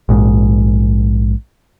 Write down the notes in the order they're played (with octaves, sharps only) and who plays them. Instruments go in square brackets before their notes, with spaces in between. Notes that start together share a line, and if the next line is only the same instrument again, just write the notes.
[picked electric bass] A#1 G#2